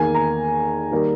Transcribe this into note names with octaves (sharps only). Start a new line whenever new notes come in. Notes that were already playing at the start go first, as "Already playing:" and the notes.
Already playing: E2 D#3 A#3 G#5
A#5
D#3 G3 A#3